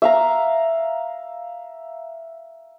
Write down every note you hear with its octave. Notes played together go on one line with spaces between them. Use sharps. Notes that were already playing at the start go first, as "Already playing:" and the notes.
E5 F5 A#5